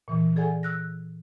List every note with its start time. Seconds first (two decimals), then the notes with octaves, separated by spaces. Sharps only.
0.08 A#2 E3
0.36 G#4 A4 D5 F#5 G#5
0.63 E6 F#6 A#6